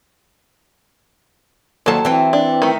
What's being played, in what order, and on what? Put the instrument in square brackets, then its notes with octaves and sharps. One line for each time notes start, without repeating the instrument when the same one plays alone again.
[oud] D#2 C5 [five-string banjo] F#3 A4 A5
[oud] E3 C4
[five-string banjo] D4
D#3 A3